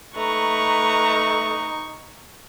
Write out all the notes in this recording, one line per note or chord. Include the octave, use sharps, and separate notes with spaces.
A3 D#4 B4 A#5 C#6